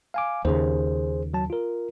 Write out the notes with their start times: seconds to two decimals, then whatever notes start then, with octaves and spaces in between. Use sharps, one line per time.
0.14 F5 G#5 D6
0.45 D#2 C#3 G#4 C5
1.34 F#3 A5
1.50 F4 A#4